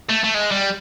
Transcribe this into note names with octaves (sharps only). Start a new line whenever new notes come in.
A3
A3
G#3
G3